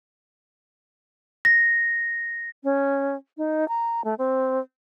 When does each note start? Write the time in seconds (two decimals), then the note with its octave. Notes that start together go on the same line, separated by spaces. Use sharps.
1.45 A#6
2.64 C#4
3.37 D#4
3.68 A#5
4.04 A3
4.18 C4